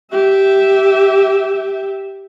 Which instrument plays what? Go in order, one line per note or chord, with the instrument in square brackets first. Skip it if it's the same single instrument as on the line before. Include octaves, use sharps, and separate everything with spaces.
[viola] G4 E5